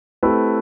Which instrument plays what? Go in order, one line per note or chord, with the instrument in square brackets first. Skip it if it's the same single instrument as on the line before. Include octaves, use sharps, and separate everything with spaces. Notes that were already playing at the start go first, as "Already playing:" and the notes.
[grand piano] A3 C4 E4 G4 B4